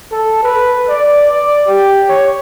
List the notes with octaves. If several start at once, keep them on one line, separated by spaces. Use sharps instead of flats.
A4
B4
D5
D5
G4
C#5